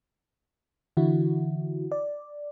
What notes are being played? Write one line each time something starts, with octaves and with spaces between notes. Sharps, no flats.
D3 E3 E4 F#4
D5